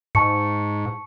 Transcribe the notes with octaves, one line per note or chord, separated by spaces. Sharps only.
G#2 A5 C#6 C#7